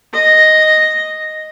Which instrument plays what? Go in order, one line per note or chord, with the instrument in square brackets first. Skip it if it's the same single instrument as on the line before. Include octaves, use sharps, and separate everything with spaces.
[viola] D#5